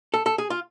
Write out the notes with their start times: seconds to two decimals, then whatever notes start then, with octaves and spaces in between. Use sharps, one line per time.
0.14 A4
0.26 A4
0.38 G#4
0.50 F4